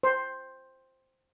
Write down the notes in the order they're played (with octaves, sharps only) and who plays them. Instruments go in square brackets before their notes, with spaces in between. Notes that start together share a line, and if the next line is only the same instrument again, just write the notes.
[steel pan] C5